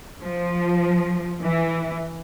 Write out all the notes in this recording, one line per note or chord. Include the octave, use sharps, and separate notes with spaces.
F3
E3